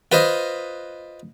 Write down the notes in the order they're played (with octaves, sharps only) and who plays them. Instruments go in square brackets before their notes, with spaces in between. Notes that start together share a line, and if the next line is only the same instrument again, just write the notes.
[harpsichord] F4 B4 C5 D#5